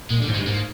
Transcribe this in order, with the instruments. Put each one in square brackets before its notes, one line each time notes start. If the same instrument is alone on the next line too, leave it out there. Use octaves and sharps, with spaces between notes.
[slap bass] A#2 [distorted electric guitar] G#3
[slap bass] D3 [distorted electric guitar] G3
[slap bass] G#2
[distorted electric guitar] G#3
[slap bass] G2
[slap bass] G#2 [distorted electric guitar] A#3